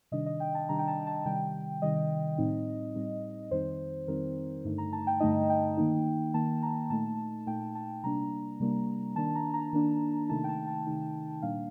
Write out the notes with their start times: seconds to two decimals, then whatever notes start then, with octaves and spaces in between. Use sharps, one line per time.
0.12 C3 D#3 G3 D4 D#5
0.26 D#5
0.40 G5
0.55 A5
0.69 C3 D#3 G3 D4 A#5
0.79 G5
0.88 A5
1.07 A5
1.25 C3 D#3 G3 G5
1.82 C3 D#3 G3 D#5
2.38 A2 G3 C4 D#4
2.95 A2 G3 C4 D#4
3.51 F2 D#3 G3 C4 D#4 C5
4.07 F2 D#3 G3 C4 D#4 A#4
4.64 G2 D3 A3 D#4
4.78 A#5
4.92 A5
5.07 G5
5.20 G2 D3 A3 D#4 D#5
5.50 G5
5.77 D#3 A#3 D#4
6.34 D#3 A#3 D#4 A5
6.63 A#5
6.90 A#2 A3 D#4 A5
7.47 A#2 A3 D#4 G5
7.75 A5
8.03 C3 G3 A#3 D4 A#5
8.60 C3 G3 A#3 D4
9.16 D#3 A#3 D4 A5
9.35 A#5
9.54 A#5
9.73 D#3 A#3 D4
10.29 C3 D#3 A3 D#4 A5
10.44 G5
10.49 A5
10.67 A5
10.87 C3 D#3 A3 D#4
11.42 A#2 G3 A#3 D4 F5